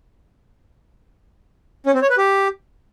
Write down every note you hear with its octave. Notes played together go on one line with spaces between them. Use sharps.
C#4
C4
C#5
B4
G4